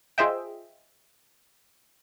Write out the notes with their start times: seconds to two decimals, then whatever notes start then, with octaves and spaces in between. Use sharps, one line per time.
0.18 F4 G#4 C5 D#5 E5 G5